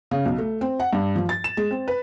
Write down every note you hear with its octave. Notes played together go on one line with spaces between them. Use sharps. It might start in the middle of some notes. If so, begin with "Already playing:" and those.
C#3
B1
A3
C4
F#5
G2
F3
A6
E7
G#3
C4
B4